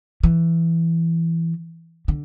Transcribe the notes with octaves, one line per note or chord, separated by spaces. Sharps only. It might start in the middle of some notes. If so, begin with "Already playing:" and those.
E3
D3